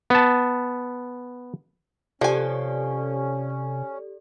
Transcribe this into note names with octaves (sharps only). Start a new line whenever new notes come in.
B3 A5
C3 F3 C#4 G4 A4 D5 G#5